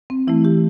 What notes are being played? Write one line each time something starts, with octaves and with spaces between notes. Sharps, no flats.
C4
E3 A3 E4
G4